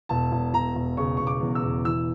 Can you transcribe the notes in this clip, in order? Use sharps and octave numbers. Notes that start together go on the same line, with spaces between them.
E1 A5
E1
E1 A#5
E1
C#3 C#6
E1 C#6
D6
E2
E6
E1
E3 E6